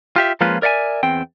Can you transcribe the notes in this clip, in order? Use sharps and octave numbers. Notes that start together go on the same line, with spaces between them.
F4 G4 E5
F3 G#3 A#3 C#4 F4 B4
A#4 D5 E5 F#5 G#5
E2 C4 G5